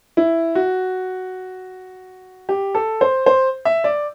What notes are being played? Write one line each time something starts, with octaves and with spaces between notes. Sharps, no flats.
E4
F#4
G4
A4
C5
C5
E5
D5